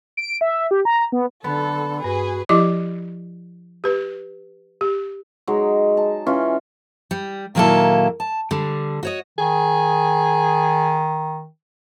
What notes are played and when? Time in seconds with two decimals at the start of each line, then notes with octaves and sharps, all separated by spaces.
0.17 D7
0.41 E5
0.71 G4
0.85 A#5
1.12 B3
1.44 D3 B3 A4
2.04 G2 F#4 G#4 B4
2.49 F3 E4 G4 D#5 D6
3.84 G4 B4
4.81 G4
5.47 F#3 G#3 D#4
5.97 A5
6.27 E3 C#4 F4
7.11 G3
7.55 A#2 D#3 F#3 A#3 E4 A4
8.20 A5
8.51 D3 G3 D4
9.03 F#4 C#5 D#5
9.38 D#3 G#4